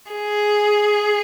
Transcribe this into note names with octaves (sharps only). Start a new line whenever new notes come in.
G#4